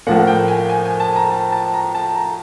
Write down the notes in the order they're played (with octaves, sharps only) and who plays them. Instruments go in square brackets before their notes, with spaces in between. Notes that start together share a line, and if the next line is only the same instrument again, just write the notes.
[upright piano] A2 F3 A#3 [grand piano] F#5
[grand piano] G5
G#5
G#5
G#5
A5
A#5
A5
A5
A#5
A5
A#5